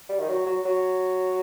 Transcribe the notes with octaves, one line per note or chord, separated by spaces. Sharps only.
G3
D#3
F#3
F#3
F#3